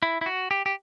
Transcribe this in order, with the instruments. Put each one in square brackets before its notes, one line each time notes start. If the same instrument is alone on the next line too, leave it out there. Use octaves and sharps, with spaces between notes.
[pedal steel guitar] E4
E4
F#4
G4
G4